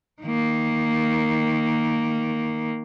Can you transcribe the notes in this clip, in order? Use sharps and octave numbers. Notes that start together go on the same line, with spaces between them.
D#3 A#3